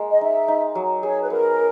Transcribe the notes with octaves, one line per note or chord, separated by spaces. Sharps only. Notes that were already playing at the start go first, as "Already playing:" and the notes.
Already playing: G#3 A#3
D#5
D#4 E5
D#4
F#3
G#4 C#5
B4
B3 A#4